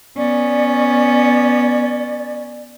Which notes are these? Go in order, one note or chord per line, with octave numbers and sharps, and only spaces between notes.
B3 C#4 D5